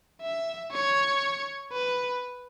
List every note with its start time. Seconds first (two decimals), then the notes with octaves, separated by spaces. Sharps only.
0.22 E5
0.72 C#5
1.72 B4